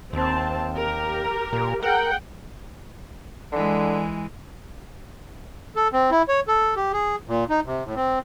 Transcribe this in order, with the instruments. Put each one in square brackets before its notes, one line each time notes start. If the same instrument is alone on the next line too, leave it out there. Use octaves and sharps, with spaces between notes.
[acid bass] D#2 [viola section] C4 A5
[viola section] G4 A#4
[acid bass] A#2
[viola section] G#4 F#5 G5 [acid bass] A#4
[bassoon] D3 [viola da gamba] E3 G#3
[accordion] A4
C4
E4
C#5
A4
G4
G#4
A#2
D#4
C3
A2
C4